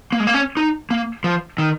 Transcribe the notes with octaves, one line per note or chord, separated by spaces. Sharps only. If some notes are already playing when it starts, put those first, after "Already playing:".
A#3
G#3
A#3
C#4
D#4
A#3
F3
D#3